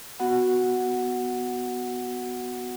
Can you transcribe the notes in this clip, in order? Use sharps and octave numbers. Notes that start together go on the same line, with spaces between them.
B3 F#4 F#5